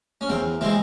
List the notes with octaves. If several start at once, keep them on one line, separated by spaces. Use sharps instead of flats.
C#4
E2 C4
E3 G#3 C4